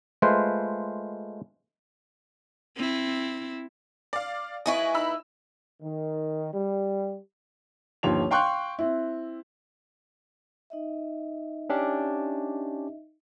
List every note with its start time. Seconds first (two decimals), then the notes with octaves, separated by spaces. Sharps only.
0.22 G#3 A3 F4 B4 C5
2.77 C4 E4
4.13 D5 F5
4.66 D#2 E4 B4 D#5 G#5 C#6
4.94 D#4 B5 E6
5.82 D#3
6.54 G3
8.03 G1 D#2 F3 C#5 C6 F7
8.31 F5 G5 C6 C#6 F#6
8.79 C4 E4
10.70 D#4 D#5 E5
11.69 C#4 D4 G4